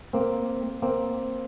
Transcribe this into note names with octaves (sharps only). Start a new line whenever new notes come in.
A#3 C4
A#3 C4